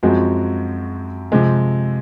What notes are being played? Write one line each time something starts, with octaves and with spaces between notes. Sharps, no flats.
F#2 F3 G#3 C4 F#4
C3 F3 G#3 C4